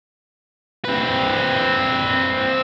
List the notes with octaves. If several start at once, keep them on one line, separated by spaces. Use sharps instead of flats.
C4 B4